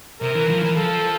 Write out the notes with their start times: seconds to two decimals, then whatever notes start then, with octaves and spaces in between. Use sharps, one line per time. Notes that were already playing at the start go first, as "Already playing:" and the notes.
0.22 C3 A#4
0.35 E3
0.50 F3
0.63 E3
0.77 F3 A4